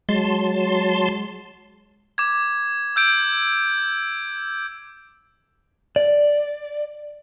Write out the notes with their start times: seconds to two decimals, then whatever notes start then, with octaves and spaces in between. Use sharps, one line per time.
0.09 F#3 G#3 A5 C6
2.18 D6 G#6
2.96 E6 G6 D7
5.96 D5